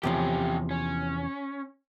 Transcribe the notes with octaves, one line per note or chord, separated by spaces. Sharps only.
E2 C3 F3 C#4 G4
C#4